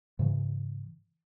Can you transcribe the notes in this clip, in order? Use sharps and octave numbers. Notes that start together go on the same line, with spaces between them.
G#2 C#3 E3